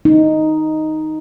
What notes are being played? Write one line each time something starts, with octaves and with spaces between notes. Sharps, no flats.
D#4